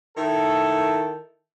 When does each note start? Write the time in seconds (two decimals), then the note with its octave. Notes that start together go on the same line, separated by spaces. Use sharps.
0.17 D#3 E4 A4